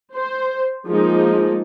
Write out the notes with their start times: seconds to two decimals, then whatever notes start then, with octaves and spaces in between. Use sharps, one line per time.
0.15 C5
0.87 F3 G#3 A#3 D#4